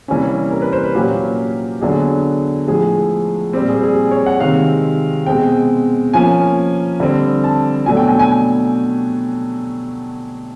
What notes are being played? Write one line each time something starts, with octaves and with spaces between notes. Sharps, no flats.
C3 E3 G3 A#3 C#4
A#4
B4
C5
B4
A#2 F#3 A#3 C#4 G4
D3 F#3 B3 D4 G#4
A2 F3 G#3 G#4
A#2 G3 C4 G4
G#4
G#4
C#5
F#5
C3 D#3 G#3 C4 F5
B2 G#3 C4 G5
F3 A#3 C#4 G#5
D3 G3 C4
A5
B2 F#3 A3 D4 G#5
G5
G#5
G#5
G#5